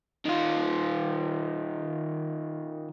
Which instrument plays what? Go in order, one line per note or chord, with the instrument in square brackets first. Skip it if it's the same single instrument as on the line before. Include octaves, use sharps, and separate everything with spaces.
[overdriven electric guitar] D#3 F4